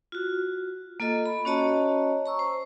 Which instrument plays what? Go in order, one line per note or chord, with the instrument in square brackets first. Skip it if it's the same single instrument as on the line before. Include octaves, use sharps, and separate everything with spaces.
[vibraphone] F4 F#4
A#3 F4 A4 D#5
B5
C#4 F#4 C#5 D#5 A5 A#5
A#5 C#6 E6
C5